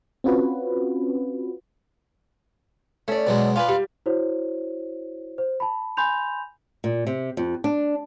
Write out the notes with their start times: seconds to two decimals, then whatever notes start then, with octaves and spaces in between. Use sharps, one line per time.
0.24 C4 C#4 F4 F#4 B4
3.08 A3 C#4 D5
3.27 B2 F#3 G#3
3.56 F4 B4 D5 G#5
3.68 G3
4.06 E4 F#4 C5 C#5
5.38 C5
5.60 A5 B5
5.97 G#5 B5 C6 G6 F7
6.84 A#2
7.07 C3
7.37 F2
7.64 D4